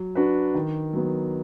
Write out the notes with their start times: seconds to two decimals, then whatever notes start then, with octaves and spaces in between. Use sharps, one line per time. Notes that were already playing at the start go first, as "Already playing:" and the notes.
Already playing: F#3
0.15 D4 F#4 B4
0.55 D#3
0.93 F#3 B3